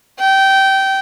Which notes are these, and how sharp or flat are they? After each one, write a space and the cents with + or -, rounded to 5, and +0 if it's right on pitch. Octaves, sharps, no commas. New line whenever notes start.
G5 -20